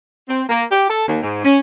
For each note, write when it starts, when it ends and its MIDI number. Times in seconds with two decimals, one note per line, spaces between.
0.28 0.42 60
0.49 0.63 58
0.71 0.86 67
0.89 1.03 69
1.07 1.17 39
1.22 1.42 44
1.44 1.58 61